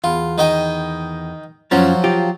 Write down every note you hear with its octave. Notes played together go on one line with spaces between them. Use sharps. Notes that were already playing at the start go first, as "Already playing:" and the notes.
E2 F4
D#3 D#5 G5
F#2 F3 F#3 C#4 F4
F4 G4